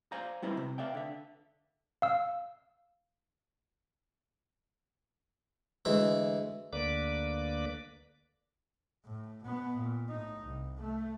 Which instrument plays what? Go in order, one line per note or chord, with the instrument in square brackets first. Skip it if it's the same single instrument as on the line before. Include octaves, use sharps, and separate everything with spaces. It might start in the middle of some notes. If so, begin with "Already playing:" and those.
[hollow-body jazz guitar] C5 D5 F5 G#5 A#5
G3 C4 E4 B4 C5 A#5
C3
B4 D5 E5 F5 G5
D3 E5
[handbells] F5 E6
[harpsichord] D2 E3 G#3 E5
[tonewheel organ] D2 D3 A#3 B4 D5 D6
[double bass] A2
B2 B3
A#2
A2 D#4
C2
A3